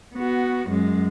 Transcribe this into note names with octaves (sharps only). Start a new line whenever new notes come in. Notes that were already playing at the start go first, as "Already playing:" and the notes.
B3 F#4
F#2 G#3